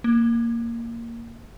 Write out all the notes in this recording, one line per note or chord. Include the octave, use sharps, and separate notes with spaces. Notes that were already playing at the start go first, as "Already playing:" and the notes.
A#3